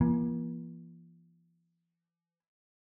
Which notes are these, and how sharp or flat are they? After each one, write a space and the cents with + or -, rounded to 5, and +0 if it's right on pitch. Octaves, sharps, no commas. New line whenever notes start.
E3 +45 A#3 +40